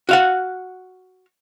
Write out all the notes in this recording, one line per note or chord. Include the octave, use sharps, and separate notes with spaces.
F#4 F5 F#5